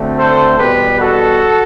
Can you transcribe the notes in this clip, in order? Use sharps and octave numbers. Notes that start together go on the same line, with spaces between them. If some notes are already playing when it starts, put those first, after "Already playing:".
Already playing: D2 D3 A3 C4
A4 C5
E2 B2 G3 B3 G4 B4
F#4 A4